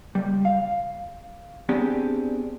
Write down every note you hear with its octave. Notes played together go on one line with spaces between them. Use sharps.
C#2 G3
F5
B3 C4 D4 G4 G#4